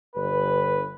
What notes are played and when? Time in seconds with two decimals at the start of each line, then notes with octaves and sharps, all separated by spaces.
0.15 G1 B4